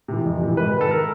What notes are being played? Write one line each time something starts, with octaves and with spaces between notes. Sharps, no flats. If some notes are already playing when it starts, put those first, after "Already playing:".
C3 E3
F2
C3 E3
G#2 B4
D#3
A4
A#4